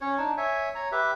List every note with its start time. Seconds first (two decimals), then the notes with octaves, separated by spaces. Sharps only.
0.01 C#4 C#5
0.18 D4 D#4
0.37 C#5 E5 G#5
0.75 C#5 A#5
0.92 G4 B4 E5